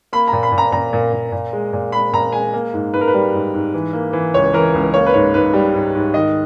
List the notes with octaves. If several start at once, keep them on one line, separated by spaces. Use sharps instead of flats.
A#3 B5
A#2 A#5
B5
A#2
A#5
A#2 A#5
A#2
A#2
A#2
G#3
A#2
G#3 B5
A#2 A#5
G#3 G#5
A#3
G#2
G#2 B4
A#4
B4
G3
G#2
G#2
E3
A#3
E3
C#2 C#5
E3 A#4
C#2
A#3 C#5
B4
G#2 C#5
G#2 B4
G3
G#2
G#2
D#3 D#5